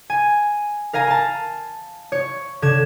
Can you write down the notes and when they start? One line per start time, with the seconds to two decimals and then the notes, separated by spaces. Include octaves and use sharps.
0.10 G#5
0.93 A#4 F5 G#5 A#5
1.08 A5 A#5
2.12 C#5
2.62 D3 G#6 E7